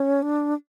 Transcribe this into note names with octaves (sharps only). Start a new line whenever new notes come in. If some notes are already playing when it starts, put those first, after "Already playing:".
Already playing: C#4
D4